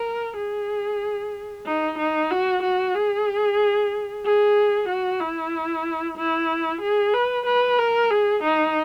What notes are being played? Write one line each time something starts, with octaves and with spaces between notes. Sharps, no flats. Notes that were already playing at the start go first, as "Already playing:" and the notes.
Already playing: A#4
G#4
D#4
D#4
F#4
F#4
G#4
G#4
F#4
E4
E4
G#4
B4
B4
A#4
G#4
D#4